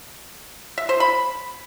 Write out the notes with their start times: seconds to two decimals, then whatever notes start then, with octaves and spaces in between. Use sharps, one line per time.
0.78 E5
0.89 C5
1.00 B5